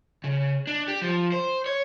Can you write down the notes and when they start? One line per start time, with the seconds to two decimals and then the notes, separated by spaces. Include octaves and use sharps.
0.24 C#3
0.67 D4
0.88 G4
1.02 F3
1.32 C5
1.66 C#5